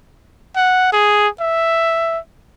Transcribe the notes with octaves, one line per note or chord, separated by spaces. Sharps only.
F#5
G#4
E5